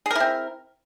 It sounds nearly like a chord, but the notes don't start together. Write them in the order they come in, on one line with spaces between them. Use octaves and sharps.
G#4 A#4 E4 C4